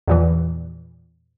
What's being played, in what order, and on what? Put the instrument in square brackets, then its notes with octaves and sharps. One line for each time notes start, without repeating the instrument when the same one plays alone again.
[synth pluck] E2 A#2 E3